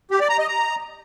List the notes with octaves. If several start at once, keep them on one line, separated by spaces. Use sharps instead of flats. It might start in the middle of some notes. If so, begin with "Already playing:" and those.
G4
D5
A#5
D#5
A#5